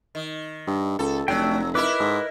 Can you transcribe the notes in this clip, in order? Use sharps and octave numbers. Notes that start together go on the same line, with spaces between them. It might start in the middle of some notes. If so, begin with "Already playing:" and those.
D#3
G2
C#2 A4
F1 F#3 A3 D4 G5
D#4 E4 A#4 B4 D6
G#2